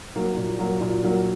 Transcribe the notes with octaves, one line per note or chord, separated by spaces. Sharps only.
F#3 A#3
A#2
F#3 A#3
A#2
F#3 A#3